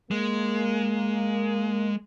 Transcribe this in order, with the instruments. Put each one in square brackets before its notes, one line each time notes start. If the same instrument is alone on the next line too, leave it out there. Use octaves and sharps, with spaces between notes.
[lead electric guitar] G#3 [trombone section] A#3